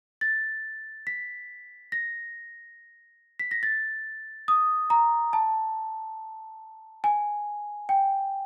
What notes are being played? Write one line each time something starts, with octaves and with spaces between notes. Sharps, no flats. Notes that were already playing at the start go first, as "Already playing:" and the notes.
A6
B6
A#6
B6
A#6
A6
D#6
A#5
A5
G#5
G5